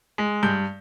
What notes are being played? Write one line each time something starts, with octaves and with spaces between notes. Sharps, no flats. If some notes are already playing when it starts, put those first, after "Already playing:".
G#3
G2 G6